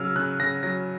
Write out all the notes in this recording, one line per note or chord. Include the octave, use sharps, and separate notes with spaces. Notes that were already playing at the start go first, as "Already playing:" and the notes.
Already playing: C#3 F#3 E6 F6
C#3 F#6
C#3 A#6
F#3 A#6